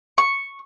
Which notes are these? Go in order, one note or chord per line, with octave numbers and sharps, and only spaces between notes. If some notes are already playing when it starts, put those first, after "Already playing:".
C#6